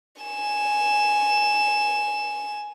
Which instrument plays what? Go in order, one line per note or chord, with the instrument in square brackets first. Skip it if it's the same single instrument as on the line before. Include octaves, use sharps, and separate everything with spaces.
[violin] G#5 E7